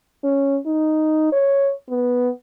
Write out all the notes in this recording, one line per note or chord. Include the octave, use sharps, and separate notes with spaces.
C#4
D#4
C#5
B3